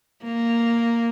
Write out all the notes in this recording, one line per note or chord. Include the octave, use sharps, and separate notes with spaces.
A#3